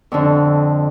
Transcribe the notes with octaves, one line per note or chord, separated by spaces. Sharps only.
F2 D3